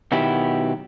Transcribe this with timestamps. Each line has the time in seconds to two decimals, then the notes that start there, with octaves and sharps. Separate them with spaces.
0.12 B2 D#3 F#3 B3 E4 G4